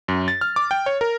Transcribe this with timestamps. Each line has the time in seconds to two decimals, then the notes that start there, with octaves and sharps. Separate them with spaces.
0.08 F#2
0.28 A6
0.41 F6
0.56 D6
0.71 G5
0.86 C#5
1.01 A#4